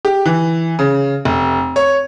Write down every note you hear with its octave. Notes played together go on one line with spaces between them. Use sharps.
G4
E3
C#3
F1
C#5